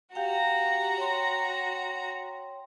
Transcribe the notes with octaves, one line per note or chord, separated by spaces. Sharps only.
F#4 G4 F5 G5 A#5
C#5 G5 C6